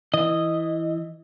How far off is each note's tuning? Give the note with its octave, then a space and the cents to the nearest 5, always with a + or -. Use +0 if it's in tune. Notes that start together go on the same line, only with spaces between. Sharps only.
E3 +0 D#5 +0